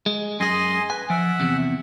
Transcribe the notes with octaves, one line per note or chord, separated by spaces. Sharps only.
G#3
F#2 G#4 D#5 G#5 C6
B4 G#5
F3 E5 F#5
E2 C3